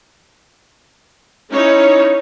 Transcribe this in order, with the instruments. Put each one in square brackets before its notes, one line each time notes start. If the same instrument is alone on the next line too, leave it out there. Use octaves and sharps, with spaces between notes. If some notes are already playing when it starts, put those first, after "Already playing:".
[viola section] C#4 D#4 E4 C#5